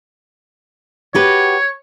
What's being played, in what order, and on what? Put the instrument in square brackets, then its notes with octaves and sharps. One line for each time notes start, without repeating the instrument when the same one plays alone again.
[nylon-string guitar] F#4 G4 B4 [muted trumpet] C#5